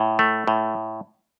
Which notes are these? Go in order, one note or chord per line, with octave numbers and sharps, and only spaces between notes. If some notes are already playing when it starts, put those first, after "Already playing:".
Already playing: A2
A3
A2